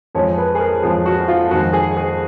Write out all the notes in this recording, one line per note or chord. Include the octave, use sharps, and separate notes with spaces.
F2 F3 G#3 C#5
B4
G#4
A#4
F2 F3 G#3 G#4
F#4
F4
F2 D#3 G#3 F#4
G#4
G#4